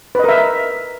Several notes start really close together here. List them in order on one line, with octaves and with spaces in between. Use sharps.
B4 D#5 A#4 E5